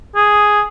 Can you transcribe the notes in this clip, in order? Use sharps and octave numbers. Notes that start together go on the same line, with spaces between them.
G#4